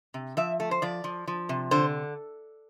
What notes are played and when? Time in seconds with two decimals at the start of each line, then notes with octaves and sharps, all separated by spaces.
0.14 C3
0.37 F3 E5
0.60 A3
0.71 C5
0.82 F3 D5
1.04 F3
1.27 F3
1.49 C3
1.71 D3 C5